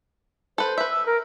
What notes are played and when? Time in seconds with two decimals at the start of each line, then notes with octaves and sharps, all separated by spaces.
0.58 A4 B4 C5
0.78 B4 E5
0.89 E6
1.06 A#4